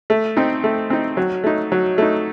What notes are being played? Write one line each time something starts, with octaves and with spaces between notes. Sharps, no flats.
A3
C4 D#4
A3
C4 D#4
F#3
A3 D#4
F#3
A3 D#4